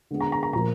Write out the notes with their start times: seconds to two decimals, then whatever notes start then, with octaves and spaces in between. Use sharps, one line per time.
0.11 D3 G#3 B3
0.20 A#5
0.32 A#5
0.43 A#5
0.53 A#2 F3 A#3 A#5